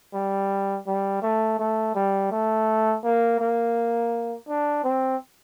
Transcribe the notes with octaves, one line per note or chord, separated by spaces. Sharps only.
G3
G3
A3
A3
G3
A3
A#3
A#3
D4
C4